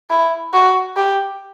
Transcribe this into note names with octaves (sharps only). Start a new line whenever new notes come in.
E4
F#4
G4